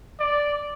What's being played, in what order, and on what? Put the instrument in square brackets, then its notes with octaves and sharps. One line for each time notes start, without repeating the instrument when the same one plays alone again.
[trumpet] D5